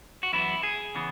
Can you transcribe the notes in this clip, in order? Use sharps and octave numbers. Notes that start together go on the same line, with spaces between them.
F#4
F#2 E3 B3 E4
G#4
C#3 E3 B3